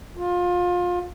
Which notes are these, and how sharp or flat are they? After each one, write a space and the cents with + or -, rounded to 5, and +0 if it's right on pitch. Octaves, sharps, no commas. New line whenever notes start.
F4 +25